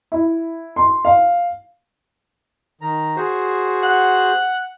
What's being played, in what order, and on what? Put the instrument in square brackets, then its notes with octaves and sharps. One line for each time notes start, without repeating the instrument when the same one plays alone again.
[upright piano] E4
C6
F5
[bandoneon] D#3 A#5
F#4 G#4 C5
[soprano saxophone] F#5